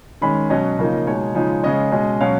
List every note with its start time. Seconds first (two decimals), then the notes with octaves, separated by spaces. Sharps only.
0.21 D#3 G#3 C#4 B5
0.50 B2 F#3 C#4 D#5
0.79 C#3 F3 A#3 D#4
1.06 B2 G#3 D#4 C#5
1.35 C#3 F3 G#3 D#4
1.64 C#3 G#3 C#4 D#5
1.92 B2 G#3 C#4
2.20 B2 F#3 C#4 F5